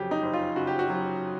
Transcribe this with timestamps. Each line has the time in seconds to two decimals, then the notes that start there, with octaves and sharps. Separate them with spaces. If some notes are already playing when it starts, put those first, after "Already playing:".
Already playing: F2 C#3 F#3 G4
0.11 D#4
0.23 F#1
0.33 F4
0.56 C#3 F#4
0.67 G4
0.79 F#4
0.90 F#3